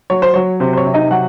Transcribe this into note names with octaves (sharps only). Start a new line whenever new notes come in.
F#3 C#5
C5
F#3 C#5
C3 C5
C5
C#5
C3
D#4 D#5
F#3 F#4 F#5